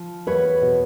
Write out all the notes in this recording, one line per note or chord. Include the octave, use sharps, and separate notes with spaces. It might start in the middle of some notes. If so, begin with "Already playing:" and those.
Already playing: F3
E2 B4 C#5
B2